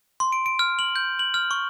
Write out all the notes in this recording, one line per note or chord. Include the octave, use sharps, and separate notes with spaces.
C6
D7
D7
F6
F#7
G6
F#7
F6
C#6